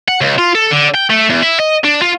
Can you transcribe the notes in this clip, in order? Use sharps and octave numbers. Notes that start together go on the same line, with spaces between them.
F#5
C#2
F4
A4
D3
G5
A3
E2
E4
D#5
D4
F4